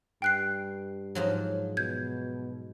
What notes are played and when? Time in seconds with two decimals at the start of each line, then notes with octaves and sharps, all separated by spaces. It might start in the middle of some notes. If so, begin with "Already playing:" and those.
0.22 G2 G5 F#6 C7
1.15 G#2 F3 F#3
1.77 B2 G6 G#6